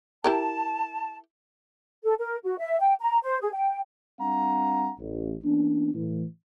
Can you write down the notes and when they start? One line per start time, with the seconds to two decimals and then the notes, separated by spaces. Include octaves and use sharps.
0.24 E4 G4 A#4 A5
2.05 A4
2.19 A#4
2.44 F#4
2.58 E5
2.80 G5
3.01 A#5
3.23 C5
3.41 G#4
3.53 G5
4.20 G3 C4 D4 F5 F#5 A#5
4.99 A1
5.44 E3 A#3 B3 C#4 D4
5.95 A2 E3